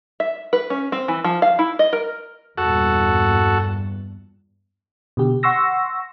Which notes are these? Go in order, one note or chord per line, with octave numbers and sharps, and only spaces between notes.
E5
B4
C#4
C4
E3
F3
F5
E4
D#5
A#4
E2 G2 A#2 F#4 A4
B2 D3 G4
F#5 C6 C#6 E6 A#6